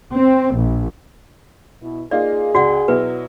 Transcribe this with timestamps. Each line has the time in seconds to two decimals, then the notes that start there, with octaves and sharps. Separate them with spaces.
0.14 C4
0.58 A#1
1.82 B2 E4
2.11 A#3 D#4 F4 G#4 D5
2.55 C#2 F#4 D5 F#5
2.88 B2 F#3 E4 B4